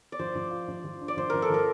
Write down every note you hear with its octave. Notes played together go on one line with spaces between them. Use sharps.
D5
F3 C5
F3
F4
F3
F3
D4
D5
F3 C5
F3 A#4
A4
F3 A#4